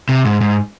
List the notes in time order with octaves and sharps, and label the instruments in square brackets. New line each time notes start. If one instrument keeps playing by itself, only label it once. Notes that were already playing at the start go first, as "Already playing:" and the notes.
[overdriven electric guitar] C3
G#2
G#2